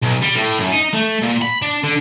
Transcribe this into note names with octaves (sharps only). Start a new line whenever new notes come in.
B1
G3
A2
F#2
D#4
A3
A#2
B5
D4
D3